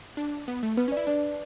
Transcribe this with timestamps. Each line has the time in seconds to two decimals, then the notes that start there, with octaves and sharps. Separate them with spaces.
0.17 D4
0.48 B3
0.63 A3
0.77 B3 B4
0.88 C#4 D5
0.97 E4
1.07 D4 D5